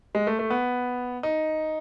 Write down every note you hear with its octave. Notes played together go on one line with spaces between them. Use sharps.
G#3
A3
A3
B3
D#4